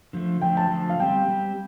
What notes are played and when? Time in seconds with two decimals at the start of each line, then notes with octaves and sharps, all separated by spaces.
0.13 D3 F3 A3
0.42 D3 F3 A3 G5
0.57 A5
0.71 D3 F3 A3
0.90 F5
0.99 G3 C4 G4 G5
1.28 G3 C4 G4